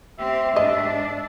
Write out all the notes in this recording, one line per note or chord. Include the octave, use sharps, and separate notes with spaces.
C4 G4 E5
G#2 D4 D#5